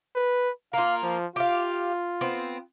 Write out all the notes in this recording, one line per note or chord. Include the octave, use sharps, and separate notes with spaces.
B4
A#3 F4 F5
F3
F4 G4 F5
B3 C4